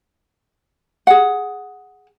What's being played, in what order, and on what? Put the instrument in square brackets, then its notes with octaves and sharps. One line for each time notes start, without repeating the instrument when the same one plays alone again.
[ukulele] G#4 F#5